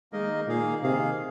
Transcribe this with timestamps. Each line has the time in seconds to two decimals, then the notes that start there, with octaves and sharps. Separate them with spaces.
0.13 D#3 G#3 A#3 D#4 A#4 D#5
0.47 A#2 D#3 A#3 G#4 F5
0.82 C3 D#3 A#3 G#4 F5